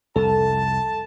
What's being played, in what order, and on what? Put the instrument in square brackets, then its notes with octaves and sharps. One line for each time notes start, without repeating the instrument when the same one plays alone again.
[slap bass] C2 F2 [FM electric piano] A4 [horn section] A5